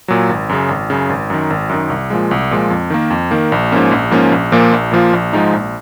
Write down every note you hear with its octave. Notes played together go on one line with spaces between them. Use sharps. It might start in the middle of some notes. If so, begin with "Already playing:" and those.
A#2 F#3
G#1
F#2 C#3
G#1
F#2 C#3
G#1
F#2 D#3
G#1
F#2 D#3
C2
A#2 F3 G#3
C2
A#2 F3 G#3
F2
D#3 A#3
F2
D#3 A#3
A#1
G#2 F3 A#3 C#4
A#1
G#2 F3 A#3 C#4
A#1
A#2 F3 A#3 F4
A#1
A#2 F3 A#3 F4
A#1
G#2 F3 G#3 D#4
A#1